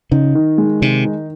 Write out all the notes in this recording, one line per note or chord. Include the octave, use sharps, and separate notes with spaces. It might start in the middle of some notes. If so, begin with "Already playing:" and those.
C#3 D#4
D#3
G#3
C3 D#3
D#4